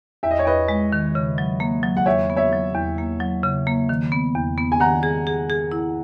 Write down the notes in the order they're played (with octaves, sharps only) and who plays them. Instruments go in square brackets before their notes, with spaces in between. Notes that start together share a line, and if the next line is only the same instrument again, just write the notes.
[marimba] E2 [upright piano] E5
[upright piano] D#5
C#5
[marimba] E2 [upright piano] B4 D#5
[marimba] G#3
D#3
C#3
F#3
A#3
F#3
[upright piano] F#5
[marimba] E2 [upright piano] C#5 E5
[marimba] B3
[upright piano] C#5 E5
[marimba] F#3
E2
A#3
F#3
C#3
A#3
D#3
B3
E2
B3
[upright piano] G#5
[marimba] D#3 [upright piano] F#5 A#5
[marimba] G#4
G#4
G#4
E4